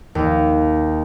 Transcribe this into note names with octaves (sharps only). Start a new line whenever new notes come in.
D#2